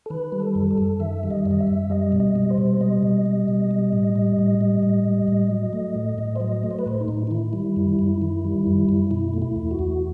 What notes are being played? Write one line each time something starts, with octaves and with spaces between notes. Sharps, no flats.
A4
D#3 B4
G3
A4
F#2
A4
F#2
D#3 E5
G3
D#5
F#2
D#5
E5
F#2
G3 D#5
B2
D#5
G3
C5
B2
G3 D#5
B2
G3
B2
G3
A2
G3
A2
G3
A2
G3
A2
F#3
A3
A2
A2
C5
F#3 D#5
A3
C5
B4
A2 C5
D#4
A2
D#4
D#3 E4
G3
F#2
F#2
D#3 E4
G3
F#2
F#2
B2 E4
A3
E4
E2
F#4
E2